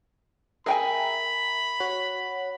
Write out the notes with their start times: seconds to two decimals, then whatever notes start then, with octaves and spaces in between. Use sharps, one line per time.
0.66 G#4 A#4 E5 G5 G#5 A#5 B5
1.80 F#4 C#5 F#5